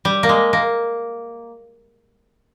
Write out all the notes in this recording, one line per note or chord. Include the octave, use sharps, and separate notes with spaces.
G3
A#3
G#3
A#3